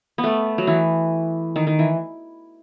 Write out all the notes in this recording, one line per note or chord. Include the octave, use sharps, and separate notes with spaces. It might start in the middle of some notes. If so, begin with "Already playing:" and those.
B3
A3
F#3
E3
D#3
D#3
E3